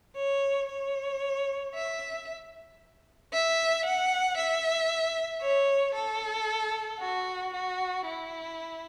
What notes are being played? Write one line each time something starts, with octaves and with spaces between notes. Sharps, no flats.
C#5
C#5
E5
E5
F#5
E5
C#5
A4
F#4
F#4
E4